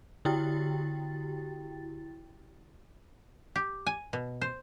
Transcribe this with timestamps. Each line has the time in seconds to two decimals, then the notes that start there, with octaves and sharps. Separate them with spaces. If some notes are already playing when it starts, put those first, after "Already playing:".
0.25 D3 E4 F#4 G4 G5 A6
3.56 G4
3.86 G#5
4.13 B2
4.41 C5